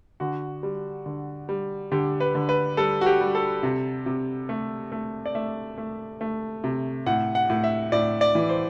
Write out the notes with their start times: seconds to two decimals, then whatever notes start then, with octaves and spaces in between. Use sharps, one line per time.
0.20 D3 F#4
0.63 G3
1.06 D3
1.49 G3
1.92 D3 G4
2.20 B4
2.35 D3
2.49 B4
2.77 G3 A4
3.01 F#4
3.06 G4
3.20 G3
3.35 A4
3.63 C3
4.06 C3
4.49 A3
4.92 A3
5.26 D5
5.35 A3 E5
5.78 A3
6.21 A3
6.64 C3
7.06 A2 F#5
7.35 F#5
7.50 A2
7.64 E5
7.92 A2 D5
8.21 D5
8.35 E3
8.49 C5